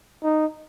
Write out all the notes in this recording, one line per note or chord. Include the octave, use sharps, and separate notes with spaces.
D#4